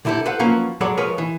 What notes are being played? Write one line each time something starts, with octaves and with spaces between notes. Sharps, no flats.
B1 D3 E4 G4 A4
A4 B4 C5 F5 F#5
F3 F#3 A#3 C#4 F4 B4
F#3 G#3 A4 C#5 D5 B5
F3 G#3 G#4 A#4 B4 C#5
E3